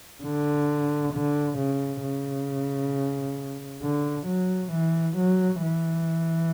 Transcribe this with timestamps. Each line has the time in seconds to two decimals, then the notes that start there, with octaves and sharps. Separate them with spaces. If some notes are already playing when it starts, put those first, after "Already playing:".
0.24 D3
1.14 D3
1.58 C#3
2.03 C#3
3.83 D3
4.27 F#3
4.72 E3
5.17 F#3
5.62 E3